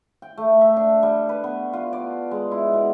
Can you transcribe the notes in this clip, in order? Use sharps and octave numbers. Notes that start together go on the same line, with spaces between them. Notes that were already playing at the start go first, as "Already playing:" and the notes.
G5
A3
E5
D4
G3
B4
B3
F4
D5
G#3
E4
B2